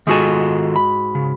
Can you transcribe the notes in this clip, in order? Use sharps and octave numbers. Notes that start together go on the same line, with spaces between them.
G#2 D#3 F4 F#4 A4 G#5
B5
C#3